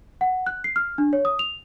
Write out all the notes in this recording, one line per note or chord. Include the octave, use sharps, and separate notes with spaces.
F#5
F#6
C7
F6
D4
C#5
D#6
F7